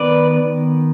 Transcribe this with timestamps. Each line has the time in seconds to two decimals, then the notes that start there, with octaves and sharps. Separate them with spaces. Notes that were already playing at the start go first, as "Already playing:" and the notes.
Already playing: D#3 B3 B4 D5